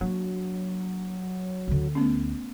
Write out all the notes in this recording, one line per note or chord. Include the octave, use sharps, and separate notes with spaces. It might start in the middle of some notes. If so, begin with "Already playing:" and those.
F#3 A#3 D4
D2 D3
A3 B3 C#4